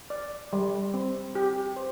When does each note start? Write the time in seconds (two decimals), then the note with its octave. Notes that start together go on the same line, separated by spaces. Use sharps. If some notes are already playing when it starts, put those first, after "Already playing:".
0.10 D5
0.53 G3
0.94 C4
1.35 G4
1.76 C5